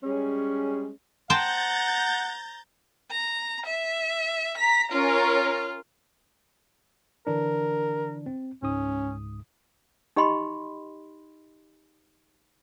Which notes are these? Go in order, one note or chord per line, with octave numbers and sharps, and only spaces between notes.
G3 G#3 C#4
C5 F#5 G5 A5 A#5 G6 A6
A#5
E5
A#5 B6
C#4 F4 A#4 F6
D3 E3 D4 A#4
C4
C#2 G#2 C#4 D#6
D#4 G4 D#5 G5 B5 C6